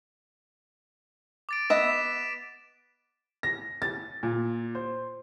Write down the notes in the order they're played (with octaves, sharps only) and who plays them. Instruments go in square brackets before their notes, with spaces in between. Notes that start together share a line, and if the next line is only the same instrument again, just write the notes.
[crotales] D6 A6 D7
[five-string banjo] B3 D#5 E5 [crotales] B6 E7
[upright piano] A#6
A6
A#2
C5